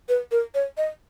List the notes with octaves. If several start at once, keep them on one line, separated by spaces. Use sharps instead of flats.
B4
A#4
C#5
D#5